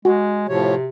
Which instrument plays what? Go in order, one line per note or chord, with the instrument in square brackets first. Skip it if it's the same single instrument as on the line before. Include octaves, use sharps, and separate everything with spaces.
[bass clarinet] G#3 [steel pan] F#4
[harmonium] A2 F3 C#5 [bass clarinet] C3